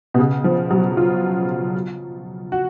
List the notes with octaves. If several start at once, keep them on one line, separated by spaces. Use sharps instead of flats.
B2
C#3
F3
F#3
F4
F#4